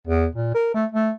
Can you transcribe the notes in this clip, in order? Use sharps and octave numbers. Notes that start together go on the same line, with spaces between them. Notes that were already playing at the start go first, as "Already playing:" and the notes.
E2
A#2
A#4
A3
A3